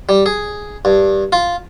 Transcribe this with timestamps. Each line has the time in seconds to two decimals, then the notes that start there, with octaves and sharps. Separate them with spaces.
0.09 G3
0.26 G#4
0.85 G2
1.32 F4